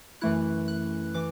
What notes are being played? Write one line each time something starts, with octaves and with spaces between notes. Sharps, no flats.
F#2 E3 A3 E4 F#6
F#6
E3 D6